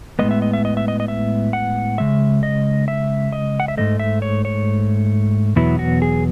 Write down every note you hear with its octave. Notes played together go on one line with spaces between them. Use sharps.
A2 G#3 B3 D#5
E5
D#5
E5
D#5
E5
D#5
D#5
E5
F#5
C#3 G#3 E5
D#5
E5
D#5
F#5
E5
G#2 E3 A3 D#5
E5
C#5
C#5
E2 B2 F#3 B3 E4
F#4
G#4